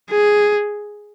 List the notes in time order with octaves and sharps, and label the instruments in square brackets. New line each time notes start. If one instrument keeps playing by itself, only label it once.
[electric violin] G#4